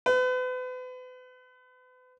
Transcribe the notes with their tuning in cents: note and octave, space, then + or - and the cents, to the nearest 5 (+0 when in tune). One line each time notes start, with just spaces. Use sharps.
B4 +40